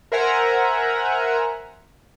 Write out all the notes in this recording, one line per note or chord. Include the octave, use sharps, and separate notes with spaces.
A#4 C5 E5 F#5 G#5 A#5